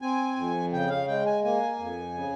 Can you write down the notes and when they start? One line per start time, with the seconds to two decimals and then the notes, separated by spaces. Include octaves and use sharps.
0.02 C4 G#5
0.37 F2
0.73 C#3 G5
0.90 F5
1.08 G#3 G5
1.26 G#5
1.44 A#3 G#5
1.79 F2
2.14 C#3